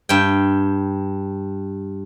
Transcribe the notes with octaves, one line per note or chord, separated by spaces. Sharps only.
G2 G5